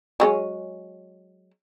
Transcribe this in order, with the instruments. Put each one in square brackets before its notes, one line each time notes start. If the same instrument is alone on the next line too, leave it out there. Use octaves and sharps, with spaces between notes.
[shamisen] F#3 G#3 C#4